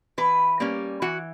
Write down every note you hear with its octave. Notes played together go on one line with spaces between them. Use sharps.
E3 B4
G3 A#3 C#4
E3 F#4